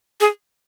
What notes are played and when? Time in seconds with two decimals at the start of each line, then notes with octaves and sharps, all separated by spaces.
0.21 G#4